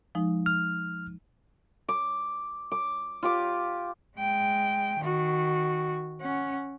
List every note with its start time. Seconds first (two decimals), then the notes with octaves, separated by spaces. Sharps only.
0.15 F3 G#3 D#4
0.46 F6
1.88 D6
2.72 D6
3.23 F4 G4 D6
4.17 G#3 G5
5.00 D#3 F#4
6.21 C#4 F#5